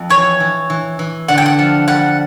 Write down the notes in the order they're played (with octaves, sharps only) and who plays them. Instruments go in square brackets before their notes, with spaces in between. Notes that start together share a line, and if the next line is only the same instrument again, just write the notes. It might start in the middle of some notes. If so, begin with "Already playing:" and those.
Already playing: [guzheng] F2
[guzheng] E3 [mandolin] C#5
[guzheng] E3
E3
E3
[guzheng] D3 [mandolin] F#5
[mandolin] G5
F#5
[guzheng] F3
[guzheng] G3 [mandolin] F#5